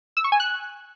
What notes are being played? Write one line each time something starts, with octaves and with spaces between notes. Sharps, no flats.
E6
C#6
G#5
F#6